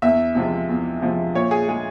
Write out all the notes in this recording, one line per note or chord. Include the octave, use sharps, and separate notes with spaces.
E2 E5
C3 F3 G#3
E2
C3 F3 G#3
A#2 C#5
G#4
G#3 G#4